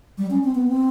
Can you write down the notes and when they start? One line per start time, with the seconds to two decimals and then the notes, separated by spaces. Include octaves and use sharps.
0.18 G3
0.30 C#4
0.43 C4
0.55 B3
0.68 C4